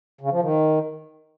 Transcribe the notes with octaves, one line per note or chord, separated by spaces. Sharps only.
C#3
F3
D#3